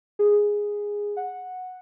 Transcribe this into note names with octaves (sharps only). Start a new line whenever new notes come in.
G#4
F#5